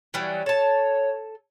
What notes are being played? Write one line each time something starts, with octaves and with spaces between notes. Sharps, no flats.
E3 F#3 G3
A4 C#5 A5